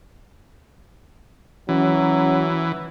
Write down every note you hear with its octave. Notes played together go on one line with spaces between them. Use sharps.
E3 F#3 C#4